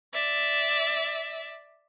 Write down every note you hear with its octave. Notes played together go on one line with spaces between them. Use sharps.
D5 E5